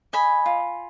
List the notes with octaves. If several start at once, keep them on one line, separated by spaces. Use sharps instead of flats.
D#5 G#5 B5
F4